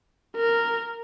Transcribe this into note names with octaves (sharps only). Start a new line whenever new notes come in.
A#4